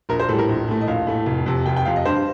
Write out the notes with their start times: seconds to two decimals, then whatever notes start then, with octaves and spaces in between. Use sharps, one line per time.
0.09 A#1 A#4
0.19 C5
0.29 A2 G3 A4
0.39 A#4
0.48 A#1
0.68 A2 A3
0.81 D#5
0.87 A#1 F5
1.07 A2 A3
1.26 F1
1.46 F2 C3
1.66 F1 G5
1.76 G5
1.85 F2 C3 F5
1.96 D#5
2.05 G2 C5